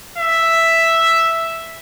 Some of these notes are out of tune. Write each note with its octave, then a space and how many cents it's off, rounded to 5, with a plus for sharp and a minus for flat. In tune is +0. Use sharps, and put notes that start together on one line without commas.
E5 +0